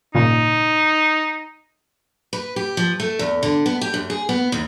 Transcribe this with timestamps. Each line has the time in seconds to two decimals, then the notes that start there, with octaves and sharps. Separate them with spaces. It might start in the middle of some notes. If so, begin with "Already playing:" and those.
0.14 G#1 A#2 C#3 D#4
2.33 B4
2.56 G4
2.77 F3
3.00 A3
3.19 E2
3.43 D3
3.66 B3
3.81 G4
3.94 F#2
4.10 G#4
4.29 B3
4.52 D#2